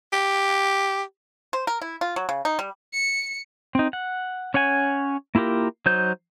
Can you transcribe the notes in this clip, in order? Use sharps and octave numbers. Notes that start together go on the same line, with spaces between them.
G4
C5
A#4
E4
F4
F#3
C#3
D#4
G3
C#7
C4 D#4
F#5
C#4 C#5 F#5 G#5
A#3 E4 F4 G4 A#4
F#3 D#4 C5 G6